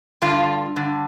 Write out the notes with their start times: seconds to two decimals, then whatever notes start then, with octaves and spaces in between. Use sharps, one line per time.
0.22 G2 D3 F4
0.76 G2 D3